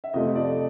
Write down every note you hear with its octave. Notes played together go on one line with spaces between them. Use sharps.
E5
F2 C3 F3 A3 D#5
D5